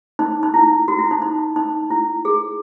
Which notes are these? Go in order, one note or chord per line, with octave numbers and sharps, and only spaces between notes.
D#4
D#4
E4
F#4
E4
D#4
D#4
D#4
E4
G#4